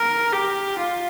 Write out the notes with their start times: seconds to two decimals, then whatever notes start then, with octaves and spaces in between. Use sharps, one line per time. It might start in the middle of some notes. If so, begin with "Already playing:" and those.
Already playing: A#4
0.32 G4
0.79 F4